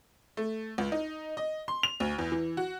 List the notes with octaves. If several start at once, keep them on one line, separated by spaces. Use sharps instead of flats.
A3
C#2
D#4
D#5
C6
F7
D2
E2
E3
F#4